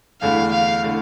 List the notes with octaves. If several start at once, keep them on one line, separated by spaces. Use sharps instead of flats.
E2 D3 A3 E4 F5
F5
D3 A3 E4